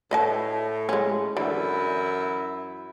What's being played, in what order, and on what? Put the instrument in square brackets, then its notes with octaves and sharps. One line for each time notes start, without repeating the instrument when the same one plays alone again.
[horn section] A2 [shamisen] B4 D#5 A5
[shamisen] G#3 C#4
[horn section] F#2 E4 [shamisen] D3 E3